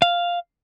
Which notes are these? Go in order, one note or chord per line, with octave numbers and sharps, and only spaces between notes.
F5